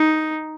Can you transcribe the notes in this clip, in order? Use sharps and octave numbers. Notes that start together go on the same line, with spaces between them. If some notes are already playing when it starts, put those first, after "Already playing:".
Already playing: D#4